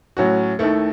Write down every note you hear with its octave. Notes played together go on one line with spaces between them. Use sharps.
A2 F#3 C#4 F#4
D#2 D#3 A3 E4 A4